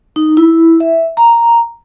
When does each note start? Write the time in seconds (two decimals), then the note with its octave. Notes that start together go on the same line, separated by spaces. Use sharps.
0.16 D#4
0.37 E4
0.80 E5
1.17 A#5